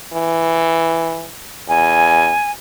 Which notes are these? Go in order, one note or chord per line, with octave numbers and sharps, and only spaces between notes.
E3
E2 G#5